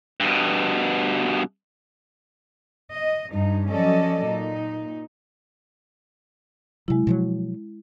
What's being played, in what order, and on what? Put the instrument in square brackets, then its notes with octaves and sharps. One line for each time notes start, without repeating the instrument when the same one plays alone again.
[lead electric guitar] G2 B2
[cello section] D#5
G2 D#4
F3 F#3 C#4 A4 D5 D#5
A#2 D#4
[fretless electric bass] C3 F#3 [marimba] G#3 E4
[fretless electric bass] B2 F3 F#3